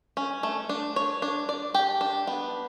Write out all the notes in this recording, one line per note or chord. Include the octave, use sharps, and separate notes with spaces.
C#4
A3
D4
C#5
D4
D5
G4
D4
B3